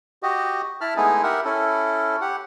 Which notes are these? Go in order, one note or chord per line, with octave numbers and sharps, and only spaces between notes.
F#4 G4 D#5
E4 A5 B5 F6
G#3 A3 B3 D#4 E4 G#4
G4 A#4 E5 F#5
C#4 E4 A4
G4 F#5